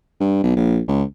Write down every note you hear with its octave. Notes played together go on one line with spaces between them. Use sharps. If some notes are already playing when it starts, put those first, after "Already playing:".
G2
B1
A#1
C#2